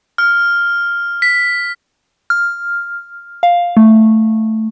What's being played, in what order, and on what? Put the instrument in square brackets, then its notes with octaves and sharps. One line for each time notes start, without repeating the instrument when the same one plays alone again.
[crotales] F6
B6
[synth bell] F6
F5
A3